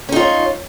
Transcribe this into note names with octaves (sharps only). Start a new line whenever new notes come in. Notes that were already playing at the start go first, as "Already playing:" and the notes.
C#4 D#4 F4 C#5